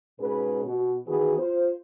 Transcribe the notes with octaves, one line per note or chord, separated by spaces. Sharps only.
G#2 B2 C#4 G#4 B4
B2 F#4
D#3 E3 B3 F#4 G#4 B4
F4 C5